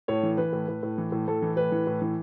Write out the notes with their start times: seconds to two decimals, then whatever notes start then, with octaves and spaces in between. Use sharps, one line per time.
0.08 A2 C#5
0.23 E3
0.37 E3 B4
0.53 A2
0.68 A2
0.83 A2
0.98 E3
1.12 A2
1.28 A2 A4
1.42 E3
1.57 A2 B4
1.72 E3
1.87 A2
2.02 E3